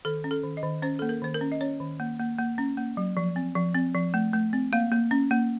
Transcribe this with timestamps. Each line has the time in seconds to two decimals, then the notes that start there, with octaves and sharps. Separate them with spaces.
0.05 D#3 A4
0.24 C#4
0.31 A4
0.43 D#3
0.57 D#5
0.63 D#3
0.82 C#4 C5
0.99 A#3 A4
1.09 A#4
1.22 D#3 C5
1.34 A#4
1.41 C#4
1.52 D#5
1.61 C#4 C#5
1.80 D#3
2.00 A#3
2.19 A#3
2.38 A#3
2.58 C#4
2.77 A#3
2.97 F#3
3.17 F3
3.36 C4
3.56 F3
3.75 C4
3.95 F3
4.14 A3
4.33 A3
4.53 C4
4.73 A#3 F5
4.92 A#3
5.11 C#4
5.31 A#3